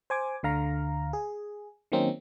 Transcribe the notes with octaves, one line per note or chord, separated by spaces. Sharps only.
C5 G#5 D6
D2 D3 F5 A#5
G#4
D#3 F#3 A#3 C4 C#4 D#4